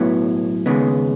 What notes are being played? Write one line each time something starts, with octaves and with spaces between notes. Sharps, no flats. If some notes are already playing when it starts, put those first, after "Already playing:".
Already playing: B1 A2 F#3 B3 E4
D#2 C#3 G#3 B3 D#4